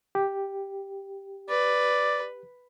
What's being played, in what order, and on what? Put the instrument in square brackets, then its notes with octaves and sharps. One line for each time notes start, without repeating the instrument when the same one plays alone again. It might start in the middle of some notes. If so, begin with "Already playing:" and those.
[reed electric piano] G4
[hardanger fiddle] B4 [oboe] D5